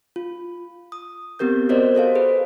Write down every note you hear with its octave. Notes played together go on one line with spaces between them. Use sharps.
F4
D#6
B3 C4 G4 A#4 G6
F#4 A#4 C5 D5 D#5
F#4 A4 C5 F5
G#4 B4